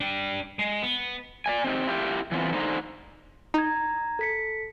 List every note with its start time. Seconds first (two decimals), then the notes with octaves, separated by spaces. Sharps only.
0.01 D4 G5
0.59 G#3
0.82 B3
1.46 D5 D#5 G#5
1.64 C4 D#4 G4
1.87 E4 F4 G4
2.32 E3 B3 C4 F4
2.53 D3 D#4 C5 A#5
3.54 D#4 A#5 G#6
4.19 A4 B6 C#7